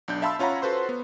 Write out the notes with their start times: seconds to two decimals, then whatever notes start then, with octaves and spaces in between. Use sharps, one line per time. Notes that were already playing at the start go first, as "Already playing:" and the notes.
0.08 B1 D4 G6
0.22 E5 F5 A5 B5 C6 E6
0.39 C#4 F4 C#5 F#5 A#5 B5
0.62 F#4 A4 B4 C5 C6
0.89 B3